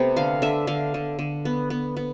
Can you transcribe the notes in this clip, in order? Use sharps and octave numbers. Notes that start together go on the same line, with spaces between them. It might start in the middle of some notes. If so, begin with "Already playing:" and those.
Already playing: C3 A3 B3 G5
D3 F5
D3 E5
D3 F5
D3
D3
B3
B3
B3